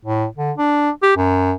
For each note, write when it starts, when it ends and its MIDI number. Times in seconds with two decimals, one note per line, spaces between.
0.05 0.25 45
0.37 0.52 50
0.58 0.90 62
1.03 1.14 67
1.17 1.53 42